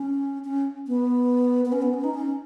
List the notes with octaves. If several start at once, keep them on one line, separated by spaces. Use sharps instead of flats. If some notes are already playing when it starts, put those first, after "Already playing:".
Already playing: C#4
C#4
B3
B3
C#4
B3
C#4
D#4
C#4